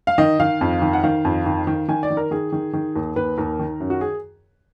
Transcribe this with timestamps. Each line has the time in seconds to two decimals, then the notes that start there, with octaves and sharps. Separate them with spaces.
0.07 F5
0.18 D#3 D#5
0.40 D#3 F5
0.61 F2
0.82 D#3
0.93 F#5
1.03 D#3 F5
1.25 F2
1.46 D#3
1.67 D#3
1.88 D#3 G#5
2.03 D5
2.10 D#3
2.17 A#4
2.31 D#3 G#4
2.52 D#3
2.73 D#3
2.96 D#2
3.16 D#2 B4
3.38 D#2 A#4
3.59 D#3
3.80 F#2
3.90 F#4
4.01 G#4